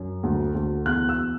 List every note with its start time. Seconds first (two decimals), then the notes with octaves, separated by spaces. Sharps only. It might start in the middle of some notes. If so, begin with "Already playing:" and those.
Already playing: F#2
0.23 D2
0.55 D2
0.85 E2 F#6
1.09 E6